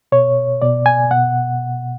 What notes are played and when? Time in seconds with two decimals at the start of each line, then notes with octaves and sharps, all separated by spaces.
0.12 B2 C#5
0.62 B2 D5
0.86 G#5
1.11 B2 F#5